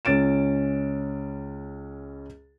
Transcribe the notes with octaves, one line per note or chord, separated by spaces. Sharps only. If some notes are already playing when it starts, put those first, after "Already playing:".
C#2 C#4 A6 D7 E7